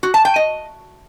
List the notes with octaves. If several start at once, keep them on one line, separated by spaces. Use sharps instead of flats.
F#4
A5
G5
D#5